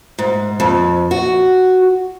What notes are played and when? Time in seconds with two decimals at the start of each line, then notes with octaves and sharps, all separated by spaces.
0.19 G#2
0.60 F2
1.11 F#4